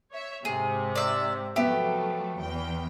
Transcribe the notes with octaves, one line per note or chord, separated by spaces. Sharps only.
C#5 E5
G#2 C3 G#4
D5 E5
F3 F#3 A3 B3 G4 E5
E2 G5